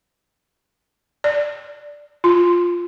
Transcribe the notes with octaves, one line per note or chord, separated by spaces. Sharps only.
D5
F4